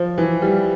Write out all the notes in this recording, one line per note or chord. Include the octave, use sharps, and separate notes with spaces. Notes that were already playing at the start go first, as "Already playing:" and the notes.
Already playing: F3
E3
G3